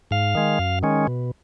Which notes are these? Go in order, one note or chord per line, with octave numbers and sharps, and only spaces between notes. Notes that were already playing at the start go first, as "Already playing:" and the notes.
G#2 F5
D#3 G#3
F#2
D#3 G#3 C#4
B2